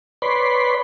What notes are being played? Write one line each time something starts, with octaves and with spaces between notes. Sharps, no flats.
B4 C#5 D5 B5 C6